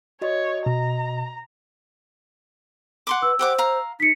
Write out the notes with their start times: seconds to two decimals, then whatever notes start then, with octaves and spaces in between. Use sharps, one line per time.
0.22 F#4 C#5 D#5
0.66 B2 A#5
3.07 F#5 C6 D6
3.22 B4 E6
3.39 G4 C5 F#5 D6
3.58 F5 A#5
4.00 D#4 B6 C#7